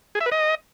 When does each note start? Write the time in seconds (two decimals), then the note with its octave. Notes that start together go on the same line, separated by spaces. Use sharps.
0.15 G#4
0.21 E5
0.26 B4
0.32 D#5